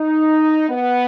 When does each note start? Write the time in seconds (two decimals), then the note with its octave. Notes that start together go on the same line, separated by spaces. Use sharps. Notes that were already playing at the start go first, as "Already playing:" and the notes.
Already playing: D#4
0.69 B3